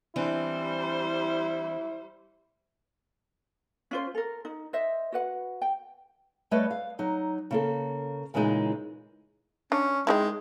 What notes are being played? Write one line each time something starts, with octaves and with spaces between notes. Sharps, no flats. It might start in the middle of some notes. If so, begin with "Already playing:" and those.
E3 G3 C4 D4 E4 C5
C#4 F4 C5
A4 A#4
D#4
C5 D#5 E5
F#4 B4 F#5
G5
G3 A3 B4 C#5 D#5
F5
F#3 D#4
C#3 A#3 A4
A#2 C#3 E3 G#3 D#4
C#4 D4
G#3 C4 D#4 E4